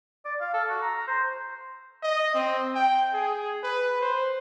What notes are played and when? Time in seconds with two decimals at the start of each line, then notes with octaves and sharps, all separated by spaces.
0.25 D5
0.40 F5
0.54 A4
0.69 F#4
0.82 A#5
1.08 C5
2.03 D#5
2.34 C4
2.75 G5
3.13 G#4
3.63 B4
4.01 C5